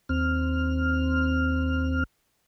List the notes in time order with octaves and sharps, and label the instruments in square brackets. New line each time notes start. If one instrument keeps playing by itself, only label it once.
[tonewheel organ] D#2 C4 F6